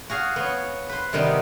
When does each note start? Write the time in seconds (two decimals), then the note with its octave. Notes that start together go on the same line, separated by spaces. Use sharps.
0.09 F#4 G#4 F5
0.36 B3 C#5
0.89 B4 C5
1.13 C3 D#3 G3 B3 C4 D#4